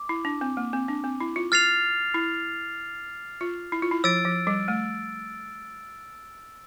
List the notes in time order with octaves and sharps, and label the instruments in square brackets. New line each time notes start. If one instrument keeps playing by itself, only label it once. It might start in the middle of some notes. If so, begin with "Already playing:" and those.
Already playing: [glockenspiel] D6
[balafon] E4
D4
C4
A#3
C4
D4
C4
E4
F4
[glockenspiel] F6 A6 C7 F7
[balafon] E4
F4
E4
F4
E4
[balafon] F3 [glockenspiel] E6 A6 D7
[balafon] F3
G3
A3